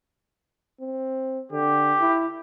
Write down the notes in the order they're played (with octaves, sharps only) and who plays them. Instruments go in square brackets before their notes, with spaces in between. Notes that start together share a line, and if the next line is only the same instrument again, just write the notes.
[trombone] C4
[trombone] D3 [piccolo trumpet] G4
[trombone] E4